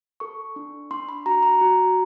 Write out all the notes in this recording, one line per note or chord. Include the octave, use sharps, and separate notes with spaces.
A4 C#6
D4
D4 C6
B5
F#4 A#5
A#5
F#4